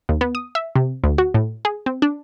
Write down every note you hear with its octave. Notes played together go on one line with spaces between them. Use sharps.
D#2
B3
D#6
E5
C3
D2
F#4
A2
G#4
C4
D4